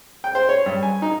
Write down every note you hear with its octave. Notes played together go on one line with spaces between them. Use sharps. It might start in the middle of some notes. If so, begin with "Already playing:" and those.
G5
C5
C#5
G2
G#5
D#4